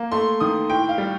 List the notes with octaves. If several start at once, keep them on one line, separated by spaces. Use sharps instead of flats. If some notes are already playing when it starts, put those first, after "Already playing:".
Already playing: A#3
A3 C6
D#3 D#6
A2 G5
F5
G3